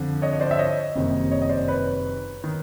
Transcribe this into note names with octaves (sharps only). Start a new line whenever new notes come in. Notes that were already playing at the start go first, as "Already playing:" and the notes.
Already playing: F2 D3 F3
C#5 D#5
C#5
C5 D5
E5
C#5 D#5
F#1 F2 C3 D#3
C#5 D#5
D#5
C5 D5
B4 C#5
D#3